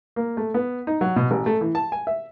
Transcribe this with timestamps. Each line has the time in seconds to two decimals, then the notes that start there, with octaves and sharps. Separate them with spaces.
0.16 A#3
0.37 A3
0.54 B3
0.87 D#4
1.01 F#3
1.16 B2
1.31 A1
1.46 A3
1.61 E3
1.75 A5
1.92 G#5
2.07 E5